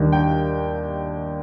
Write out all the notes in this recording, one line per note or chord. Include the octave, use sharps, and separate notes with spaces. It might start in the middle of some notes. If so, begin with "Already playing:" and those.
Already playing: D#2 D#3 G3 D4
G5